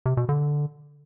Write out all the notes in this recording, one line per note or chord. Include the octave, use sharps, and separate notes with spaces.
C3
B2
D3